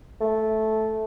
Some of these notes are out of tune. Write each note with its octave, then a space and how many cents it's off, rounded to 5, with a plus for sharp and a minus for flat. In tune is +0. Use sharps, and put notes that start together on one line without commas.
A3 -10